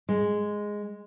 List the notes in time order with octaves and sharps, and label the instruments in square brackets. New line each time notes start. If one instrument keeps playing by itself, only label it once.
[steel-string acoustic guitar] G#3